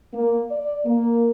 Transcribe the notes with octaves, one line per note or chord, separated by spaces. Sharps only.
A#3
D5
A#3